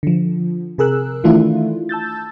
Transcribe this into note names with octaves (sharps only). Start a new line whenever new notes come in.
D3 F3
C3 G#4 A#4 E6 F#6
D#3 E3 A3 D4 E4 F4
A5 E6 G6 A6